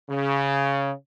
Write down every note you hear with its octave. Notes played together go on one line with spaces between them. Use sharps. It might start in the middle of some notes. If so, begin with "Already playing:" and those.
C#3